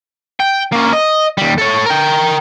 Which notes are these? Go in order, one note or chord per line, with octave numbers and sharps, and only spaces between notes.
G5
A#3 C#4
D#5
D#2 G3
A4 C#5
A#4 G5